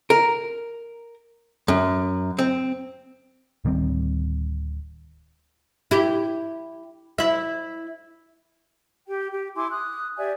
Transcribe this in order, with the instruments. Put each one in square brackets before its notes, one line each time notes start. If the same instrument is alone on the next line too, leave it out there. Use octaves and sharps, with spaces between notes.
[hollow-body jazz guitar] A#4
F#2
C4
[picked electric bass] D1 D#3 G3 C4
[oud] E4 G4
E4 E5
[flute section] G4 G5
G4
E4 G#5 C6 D6
D#6 F#6
G4 D5 E5 G#5